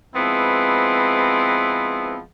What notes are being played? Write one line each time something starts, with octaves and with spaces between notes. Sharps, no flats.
F3 G#3 B3 C4 E4 B4